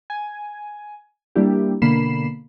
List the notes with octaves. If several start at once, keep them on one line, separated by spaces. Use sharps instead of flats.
G#5
G3 A#3 D4 E4 G4
B2 D3 A#3 B5 C7 E7